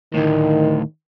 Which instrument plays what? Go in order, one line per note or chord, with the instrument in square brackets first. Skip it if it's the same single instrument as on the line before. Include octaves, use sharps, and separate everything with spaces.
[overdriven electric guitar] D2 A2 [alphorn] D#3